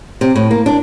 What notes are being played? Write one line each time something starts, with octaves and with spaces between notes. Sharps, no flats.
C3
A2
A#3
D4